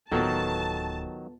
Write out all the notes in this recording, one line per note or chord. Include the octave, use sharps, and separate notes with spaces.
D1 D#3 F#3 B3 F4 A4 A5